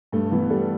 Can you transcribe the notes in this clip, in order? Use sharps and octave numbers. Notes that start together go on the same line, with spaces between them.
G2 A3
E3 B3
G3 A4